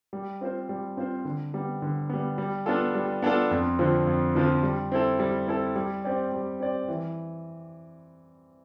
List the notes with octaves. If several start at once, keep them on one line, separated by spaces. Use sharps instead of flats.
G3
C4 F4 C5
G3
C4 F4 C5
D3
G3 B3
D3
G3 B3
G3
B3 D4 F4 A4
G3
B3 D4 F4 A4
F2
D3 F3 C4 F4
F2
D3 F3 C4 F4
G3
C4 E4 A4
G3
C4 E4 A4
G3
C4 G4 D5
G3
C4 G4 D5
E3